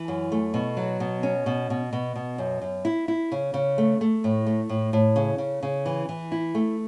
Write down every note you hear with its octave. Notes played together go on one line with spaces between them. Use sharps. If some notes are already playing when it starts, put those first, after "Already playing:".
Already playing: E3
F#2
A3
B2
F#3
B2
C#4
B2
B2
B2
B2
F#2
F#2
E4
E4
C#3
C#3
A3
A3
A2
A3
A2
A2
C#3
C#3
C#3
E3
E3
E4
A3